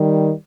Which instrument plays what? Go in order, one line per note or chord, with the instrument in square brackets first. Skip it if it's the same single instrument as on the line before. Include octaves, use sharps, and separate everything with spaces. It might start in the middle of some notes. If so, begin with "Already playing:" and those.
Already playing: [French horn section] D#3 G3